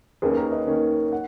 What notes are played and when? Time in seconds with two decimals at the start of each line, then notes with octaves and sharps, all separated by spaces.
0.22 D#2 D#3 A#3 C#4 G#4 B4
0.37 A#4
0.52 B4 D#5
0.67 D#2 D#3 A#3 C#4
1.12 F#5